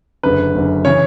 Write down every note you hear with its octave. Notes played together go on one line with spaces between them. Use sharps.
F#1 F#2 D3 B4
F#1 F#2 D3
C#3 E3 C#5